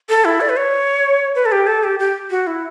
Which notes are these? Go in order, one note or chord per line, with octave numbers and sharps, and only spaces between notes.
A4
E4
D5
B4
C#5
B4
A4
G4
A4
G4
G4
F#4
E4